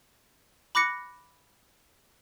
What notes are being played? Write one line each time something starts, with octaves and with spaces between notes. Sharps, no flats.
B5 D6 F#6 A#6 C#7